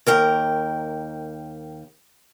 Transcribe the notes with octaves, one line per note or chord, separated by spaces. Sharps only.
D#2 A#4 G5